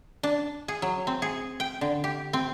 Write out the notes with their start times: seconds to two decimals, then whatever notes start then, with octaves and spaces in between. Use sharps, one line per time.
0.23 D4
0.68 G#4
0.82 F#3
1.07 C4
1.22 G#4
1.60 G5
1.81 D3
2.04 G4
2.33 C4